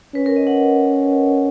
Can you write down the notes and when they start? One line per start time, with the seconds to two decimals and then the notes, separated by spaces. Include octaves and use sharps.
0.15 C#4 B4
0.26 A#4
0.36 D#5
0.47 F#5